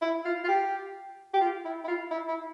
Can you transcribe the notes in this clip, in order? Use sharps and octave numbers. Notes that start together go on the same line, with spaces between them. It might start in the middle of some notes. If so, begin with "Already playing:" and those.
E4
F4
F4
G4
G4
F4
E4
E4
F4
E4
E4